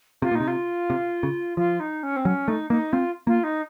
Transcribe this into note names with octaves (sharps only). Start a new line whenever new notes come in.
C3 F4
A#2
D#4
C3
F4
C3
C#3
F3 F4
D#4
C#4
C4
F#3 C#4
A3 D#4
A#3 D#4
C4 F4
A#3 F4
D#4